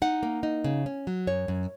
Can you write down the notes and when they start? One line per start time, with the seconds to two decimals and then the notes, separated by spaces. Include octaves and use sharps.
0.02 D#4 F#5
0.23 A#3
0.43 D#4
0.64 C#3
0.86 C#4
1.07 F#3
1.27 F#2 C#5
1.48 F#2